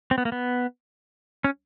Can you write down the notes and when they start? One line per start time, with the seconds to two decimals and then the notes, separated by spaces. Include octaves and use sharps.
0.11 C4
0.18 B3
0.25 A#3
0.32 B3
1.44 C#4